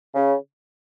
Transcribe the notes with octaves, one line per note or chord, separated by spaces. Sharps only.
C#3